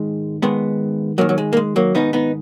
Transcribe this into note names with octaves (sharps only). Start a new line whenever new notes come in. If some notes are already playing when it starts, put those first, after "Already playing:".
Already playing: G#2 D#3 G#3
G#2 D#3 G#3 B3
G#2 D#3 F#3 A#3
F#3
G#3
A#3
G#3
F#3 A#3
G#2 D#3 B3 D#4
B3 D#4